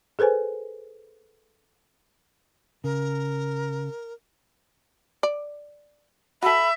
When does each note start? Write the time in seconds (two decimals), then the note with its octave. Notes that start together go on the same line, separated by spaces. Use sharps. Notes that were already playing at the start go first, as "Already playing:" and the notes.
0.19 G#4 A4 B4 C5 G#5
2.84 C#3 A#4
5.23 D5
6.43 F#4 A4 E5 B5